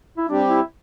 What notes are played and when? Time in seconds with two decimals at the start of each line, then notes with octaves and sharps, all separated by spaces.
0.18 E4
0.29 G3 C4 D4 G4
0.48 E4